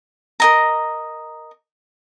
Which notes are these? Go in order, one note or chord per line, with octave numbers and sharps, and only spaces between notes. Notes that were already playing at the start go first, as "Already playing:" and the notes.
A#4 D#5 A#5